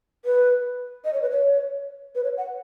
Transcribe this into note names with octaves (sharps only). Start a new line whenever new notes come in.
B4
D#5
C#5
B4
C#5
B4
C#5
F#5